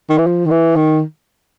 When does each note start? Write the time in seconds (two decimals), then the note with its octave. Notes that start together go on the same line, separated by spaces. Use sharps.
0.10 D#3
0.18 E3
0.26 F3
0.46 D#3
0.51 E3
0.76 D#3